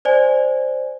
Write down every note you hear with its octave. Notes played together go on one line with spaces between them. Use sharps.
C5 D5 G#5